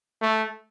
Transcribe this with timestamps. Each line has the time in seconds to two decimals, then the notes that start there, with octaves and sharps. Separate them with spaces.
0.22 A3